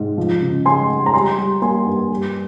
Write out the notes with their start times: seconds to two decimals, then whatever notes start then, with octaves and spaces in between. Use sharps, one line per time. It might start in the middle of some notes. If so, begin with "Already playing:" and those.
Already playing: G#2
0.18 F3
0.41 C#3
0.65 G#3 G#5 C6
0.89 G#3
1.06 A#5
1.14 G3 G#5 C6
1.38 G3
1.62 A#3 G#5 C6
1.86 G2
2.10 G3